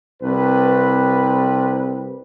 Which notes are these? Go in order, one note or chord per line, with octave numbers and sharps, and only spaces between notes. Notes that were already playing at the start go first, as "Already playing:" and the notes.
C2 C4 B4